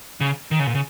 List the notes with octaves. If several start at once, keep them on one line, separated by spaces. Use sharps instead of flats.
C#3
D#3
C#3
A#2
C#3